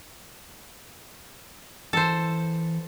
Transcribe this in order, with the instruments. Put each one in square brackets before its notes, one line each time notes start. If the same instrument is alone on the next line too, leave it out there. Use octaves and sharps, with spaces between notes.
[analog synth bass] E3 [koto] A4 C5